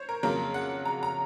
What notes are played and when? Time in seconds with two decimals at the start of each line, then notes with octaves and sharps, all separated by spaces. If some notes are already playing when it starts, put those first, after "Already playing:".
Already playing: C5 C#5
0.09 A#4
0.23 F2 C#3 F#3 A#3 A#4
0.54 F#5
0.85 A#5
1.03 A#5